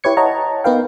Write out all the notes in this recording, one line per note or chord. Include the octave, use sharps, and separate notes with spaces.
E4 G4 B4 C#5 G#6 C#7
C#5 D#5 F#5 A5 A#5
B3 D#4 A#4 B4 F5 G5